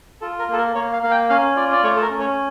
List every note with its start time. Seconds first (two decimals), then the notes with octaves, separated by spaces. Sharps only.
0.21 F4 A4
0.39 A#4
0.48 A#3 A4
0.58 A#4
0.75 A#3 C#5
0.93 F5
1.03 A#3 F5
1.11 G5
1.30 C#4 F5
1.56 F4 D5
1.73 D5
1.84 A3 C#5
1.96 A4
2.02 A#4
2.10 C#4
2.20 C#5